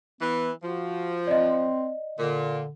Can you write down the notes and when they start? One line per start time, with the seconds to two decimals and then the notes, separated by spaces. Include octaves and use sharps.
0.21 E3 B3
0.63 F3 F#4
1.27 C4 D5 D#5
2.19 A#2 D3